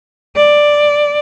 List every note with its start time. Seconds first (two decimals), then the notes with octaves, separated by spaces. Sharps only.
0.36 D5